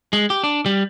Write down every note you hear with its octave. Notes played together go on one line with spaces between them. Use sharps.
G#3
G4
D4
G3